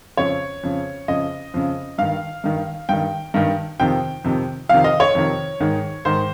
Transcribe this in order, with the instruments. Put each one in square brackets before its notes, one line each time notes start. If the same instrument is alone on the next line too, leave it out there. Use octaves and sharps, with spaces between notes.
[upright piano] F2 C#3 C#5
F2 C#3
F2 C#3 D#5
F2 C#3
G2 D#3 F5
G2 D#3
G2 D#3 G5
G2 D#3
F2 C3 D#3 G5
F2 C3 D#3
F2 C3 D#3 F5
D#5
C#5
F2 C3 D#3
G#2 D#3
G#2 D#3 C5